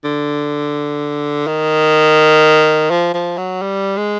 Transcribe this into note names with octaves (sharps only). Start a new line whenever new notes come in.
D3
D#3
F3
F3
F#3
G3
G#3